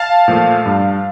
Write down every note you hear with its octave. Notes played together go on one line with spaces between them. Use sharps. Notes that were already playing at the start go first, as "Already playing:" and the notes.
Already playing: F5 A5
A#2 F3 A3
G2